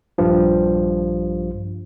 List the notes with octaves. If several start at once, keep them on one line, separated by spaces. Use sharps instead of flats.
A#1 G2 F3